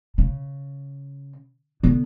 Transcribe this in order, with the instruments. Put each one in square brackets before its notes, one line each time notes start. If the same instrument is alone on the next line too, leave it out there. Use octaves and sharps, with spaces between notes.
[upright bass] C#3
D3 B3